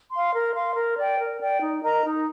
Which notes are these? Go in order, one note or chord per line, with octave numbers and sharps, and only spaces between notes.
F5 C6
A#4
F5 C6
A#4
D5 G5
A#4
D5 G5
D#4
A#4 D#5 A#5
D#4